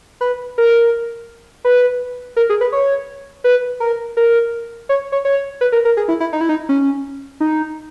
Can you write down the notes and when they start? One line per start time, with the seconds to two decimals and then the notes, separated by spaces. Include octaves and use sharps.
0.21 B4
0.58 A#4
1.64 B4
2.36 A#4
2.50 G#4
2.61 B4
2.72 C#5
3.44 B4
3.80 A#4
4.17 A#4
4.89 C#5
5.12 C#5
5.25 C#5
5.61 B4
5.72 A#4
5.85 A#4
5.97 G#4
6.08 E4
6.20 E4
6.33 D#4
6.41 E4
6.49 D#4
6.69 C#4
7.40 D#4